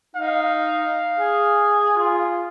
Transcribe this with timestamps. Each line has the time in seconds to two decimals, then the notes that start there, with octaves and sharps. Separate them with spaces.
0.16 D#4 F5
1.19 G#4
1.95 F4